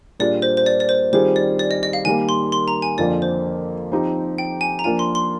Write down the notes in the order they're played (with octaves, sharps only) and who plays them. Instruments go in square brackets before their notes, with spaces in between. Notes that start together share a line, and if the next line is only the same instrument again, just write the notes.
[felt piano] A#2 G3 D4 F4 G#4 [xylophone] D5
[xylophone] C5
C5
D5
D5
C5
[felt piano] D#3 G3 C4 F4 G#4 [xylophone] C5
[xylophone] D5
D5
D#5
D#5
F5
[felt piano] D#3 G3 A#3 [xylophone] G#5
[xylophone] C6
C6
A#5
G#5
[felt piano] F2 D3 F3 A#3 [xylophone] D5
[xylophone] C5
[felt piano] F3 C4 D#4 G4
[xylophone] G5
G#5
A#5
[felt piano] F3 A#3 D4 F4 [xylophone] G#5
[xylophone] C6
C6